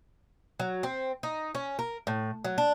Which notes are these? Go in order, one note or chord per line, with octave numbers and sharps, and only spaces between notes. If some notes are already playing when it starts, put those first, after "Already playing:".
F#3
C4
D#4
C#4
A#4
A2
F#3
D4